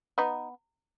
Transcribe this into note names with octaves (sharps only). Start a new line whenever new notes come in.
B3 D#4